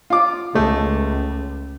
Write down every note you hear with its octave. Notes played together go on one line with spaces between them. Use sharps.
F4 D6
C#2 G#3 A3